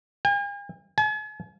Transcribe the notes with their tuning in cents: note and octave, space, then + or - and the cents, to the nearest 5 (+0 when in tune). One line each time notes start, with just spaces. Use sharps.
G#5 -45
G#5 +45